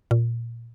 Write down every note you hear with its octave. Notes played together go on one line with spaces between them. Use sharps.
A#2